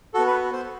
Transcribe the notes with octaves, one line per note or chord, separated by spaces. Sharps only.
B3 F#4 A4
B4
C5